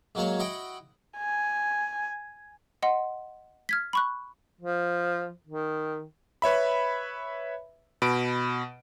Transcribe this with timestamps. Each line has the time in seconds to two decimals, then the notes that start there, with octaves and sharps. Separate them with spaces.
0.15 G#2 F#3 A#3 F#4 C#5
0.39 E4 F#4 D#5 F#5 G5
1.18 G#5
2.83 D#5 F#5 C6
3.69 F6 G#6 B6
3.93 B5 C#6 F#6
4.61 F3
5.47 D#3
6.42 B4 C#5 E5 B5
8.02 B2 B5 D7